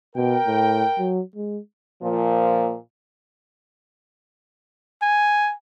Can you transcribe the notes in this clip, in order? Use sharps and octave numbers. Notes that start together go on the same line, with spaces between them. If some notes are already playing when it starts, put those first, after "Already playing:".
B2 A#4 G5
A2
F#3
G#3
A#2 F3
G#5